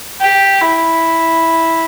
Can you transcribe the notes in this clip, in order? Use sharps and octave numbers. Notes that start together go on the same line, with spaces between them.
G4
E4